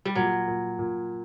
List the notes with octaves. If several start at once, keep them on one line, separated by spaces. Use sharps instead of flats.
G3
A#2 F#3
A#2
A#2